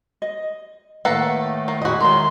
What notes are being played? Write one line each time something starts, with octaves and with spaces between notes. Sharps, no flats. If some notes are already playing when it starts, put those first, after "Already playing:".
D#5
A2 D#3 A3 A#3 A4 B4 F#5
A#3
E2 A#2 E4 F#4 D#5
D#3 F#3 G#3 A3 A#4 C6